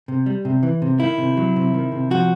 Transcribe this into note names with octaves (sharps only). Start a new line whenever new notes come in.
C3
G3
C3
E3
C3
D#3 E4
C3
F#3
C3
D#3
C3
F3 F#4